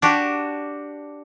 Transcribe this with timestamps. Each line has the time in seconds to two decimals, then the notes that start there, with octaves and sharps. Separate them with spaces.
0.02 D4 F#4 G4